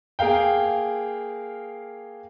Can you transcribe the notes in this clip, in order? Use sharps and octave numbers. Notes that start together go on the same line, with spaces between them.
A#3 G#4 A#4 F5 G5